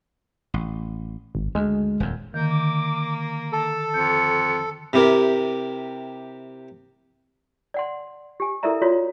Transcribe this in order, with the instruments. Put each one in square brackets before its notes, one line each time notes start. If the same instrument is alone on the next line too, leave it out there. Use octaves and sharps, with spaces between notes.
[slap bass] A1
[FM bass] G#1
[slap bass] D2 [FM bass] G#3
[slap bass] D#1 F2
[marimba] D3 D#3 [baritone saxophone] A#3 [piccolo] G6
[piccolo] D6
[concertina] A4 [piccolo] A5
[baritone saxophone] F2 [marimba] G6 [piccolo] C#7
[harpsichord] C3 E4 G4 A#4
[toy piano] D5 F#5 C6
G4 G#5
E4 A4 A#4 D5 E5 A#5
F4 F#4 C#5 D5